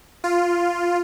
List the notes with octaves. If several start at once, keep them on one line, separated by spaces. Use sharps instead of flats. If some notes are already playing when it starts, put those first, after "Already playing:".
F4